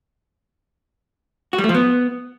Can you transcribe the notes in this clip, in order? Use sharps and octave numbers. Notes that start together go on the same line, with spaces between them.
F#4
G3
A3
F3
B3